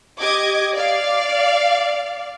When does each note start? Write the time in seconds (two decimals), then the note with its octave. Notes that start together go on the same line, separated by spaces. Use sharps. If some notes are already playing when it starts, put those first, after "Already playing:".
0.20 G4 D#5 D6 G#6
0.73 D5 F5